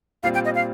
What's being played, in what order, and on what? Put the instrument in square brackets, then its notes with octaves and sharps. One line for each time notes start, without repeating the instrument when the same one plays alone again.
[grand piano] A#2 G3 C4 F4 [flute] F5
[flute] G5
D#5
F5